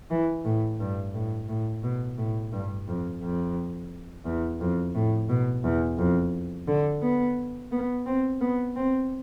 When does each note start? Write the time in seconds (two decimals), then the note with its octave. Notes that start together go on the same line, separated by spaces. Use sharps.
0.10 E3
0.45 A2
0.80 G2
1.14 A2
1.49 A2
1.83 B2
2.18 A2
2.52 G2
2.87 F2
3.22 F2
4.25 E2
4.61 F2
4.95 A2
5.29 B2
5.64 E2
5.98 F2
6.68 D3
7.02 B3
7.72 B3
8.06 C4
8.41 B3
8.76 C4